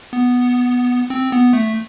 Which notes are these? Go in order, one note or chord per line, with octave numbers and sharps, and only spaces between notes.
B3
C4
B3
A3